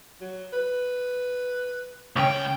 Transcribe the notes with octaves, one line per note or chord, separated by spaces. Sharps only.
F#3
B4
C#2 C#4 G5